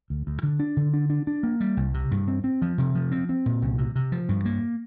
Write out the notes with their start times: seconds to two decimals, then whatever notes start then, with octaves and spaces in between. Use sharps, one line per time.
0.10 D2
0.27 D2
0.43 D3
0.60 D4
0.77 D3
0.94 D4
1.10 D4
1.27 D4
1.43 A#3
1.60 G3
1.77 C2
1.94 C3
2.11 G2
2.28 C4
2.44 C4
2.62 F3
2.78 C3
2.95 F3
3.12 C4
3.29 C4
3.46 A#2
3.62 C2
3.78 C3
3.96 C3
4.12 F3
4.29 G2
4.45 A#3